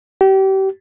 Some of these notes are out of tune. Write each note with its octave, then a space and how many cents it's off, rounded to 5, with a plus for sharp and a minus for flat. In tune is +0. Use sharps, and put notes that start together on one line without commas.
G4 -30